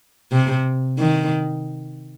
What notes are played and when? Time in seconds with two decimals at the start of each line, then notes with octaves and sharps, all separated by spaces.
0.32 C3
0.98 D#3